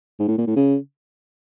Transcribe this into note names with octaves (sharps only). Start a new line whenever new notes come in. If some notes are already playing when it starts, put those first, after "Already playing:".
G#2
A2
A#2
A2
C#3